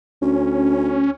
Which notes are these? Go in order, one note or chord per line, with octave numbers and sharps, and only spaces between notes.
D2 C#4